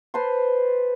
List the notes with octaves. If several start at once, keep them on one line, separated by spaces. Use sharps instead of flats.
B4 C5 A5 C6